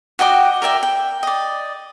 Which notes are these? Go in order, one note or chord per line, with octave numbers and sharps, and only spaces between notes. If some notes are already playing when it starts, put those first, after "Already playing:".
F#4 D#5 G5 D6
A#4 D5 E5 G5
G5
D5 D#5